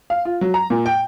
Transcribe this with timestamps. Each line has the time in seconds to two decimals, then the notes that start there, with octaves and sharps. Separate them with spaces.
0.10 F5
0.25 F4
0.41 F#3
0.54 A#5
0.70 A#2
0.86 G5